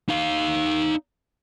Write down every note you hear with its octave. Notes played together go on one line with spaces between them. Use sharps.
D#4 F5